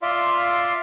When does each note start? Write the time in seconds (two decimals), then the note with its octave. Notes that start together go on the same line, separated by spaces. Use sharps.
0.02 F4 D5 E5 F5 C6